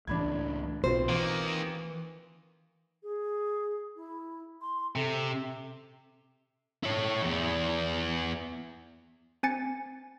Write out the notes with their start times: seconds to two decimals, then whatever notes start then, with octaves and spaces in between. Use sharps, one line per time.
0.07 C#2 A2 E3 D4 B5 G#6
0.84 B1 B2 C4 F4 C5
1.09 D#3 E3 A#3
3.03 G#4
3.96 E4
4.61 C6
4.96 C3 A4
6.83 E4 C#5
7.22 E2
9.43 C4 G#5 A6 C#7